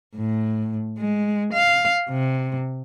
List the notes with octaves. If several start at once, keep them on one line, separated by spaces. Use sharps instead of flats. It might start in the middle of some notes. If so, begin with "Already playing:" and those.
A2
G#3
F5
C3